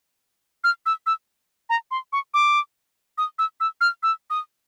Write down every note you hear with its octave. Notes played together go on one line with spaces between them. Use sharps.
F6
E6
E6
A#5
C6
C#6
D6
D#6
E6
E6
F6
E6
D#6